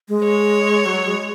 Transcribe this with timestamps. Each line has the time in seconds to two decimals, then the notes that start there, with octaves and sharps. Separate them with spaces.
0.09 G#3
0.25 C#5
0.86 F#3
1.07 G#3